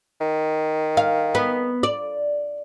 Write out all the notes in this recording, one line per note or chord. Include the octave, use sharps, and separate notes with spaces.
D#3
F5
B3
D5